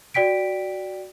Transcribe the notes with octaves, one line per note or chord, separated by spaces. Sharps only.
F#4 D5 G5 B6 D7